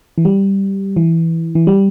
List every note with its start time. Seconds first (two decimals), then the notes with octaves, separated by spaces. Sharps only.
0.18 E3
0.25 G3
0.96 E3
1.55 E3
1.67 G3